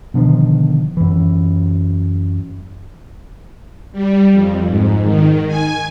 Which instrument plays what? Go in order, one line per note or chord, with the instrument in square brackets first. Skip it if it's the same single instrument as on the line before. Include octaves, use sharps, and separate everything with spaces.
[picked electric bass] B2 D3 D#3 F3
F#2 E3
[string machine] G3
F2
G#2
D#3
G#5